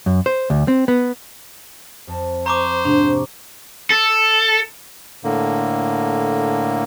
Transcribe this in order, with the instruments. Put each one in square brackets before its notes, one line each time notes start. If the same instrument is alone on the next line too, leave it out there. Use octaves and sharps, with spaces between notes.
[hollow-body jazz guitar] F#2
C5
D2
C4
B3
[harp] F2 A5 A#6
[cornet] C5 [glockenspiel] A#5 C#6 D6
[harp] G#2 C3 A3 [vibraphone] D4
[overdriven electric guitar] A4
[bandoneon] A2 D3 A#3